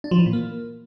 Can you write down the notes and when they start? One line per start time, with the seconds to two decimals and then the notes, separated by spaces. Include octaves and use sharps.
0.04 D4
0.11 F3
0.19 E3
0.26 A#2
0.33 A#3